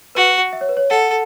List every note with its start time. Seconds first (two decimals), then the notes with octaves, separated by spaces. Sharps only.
0.15 F#4 B4
0.53 E5
0.61 C#5
0.69 B4
0.77 C#5
0.90 A4 F#5